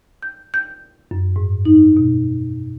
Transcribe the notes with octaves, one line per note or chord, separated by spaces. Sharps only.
G6
G6
F#2
G#2
D#4
B2